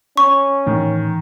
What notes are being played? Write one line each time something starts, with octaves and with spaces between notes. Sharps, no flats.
C#4 C#6
A2 D#3 E3